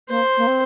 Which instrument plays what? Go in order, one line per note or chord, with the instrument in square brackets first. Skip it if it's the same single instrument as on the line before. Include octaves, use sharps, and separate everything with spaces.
[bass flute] A#3 [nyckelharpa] C5
[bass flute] A#3
C4